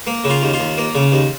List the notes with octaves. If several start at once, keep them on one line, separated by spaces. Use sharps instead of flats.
A#3
C#3
F4
D#2
F4
D#2
A#3
C#3
D#2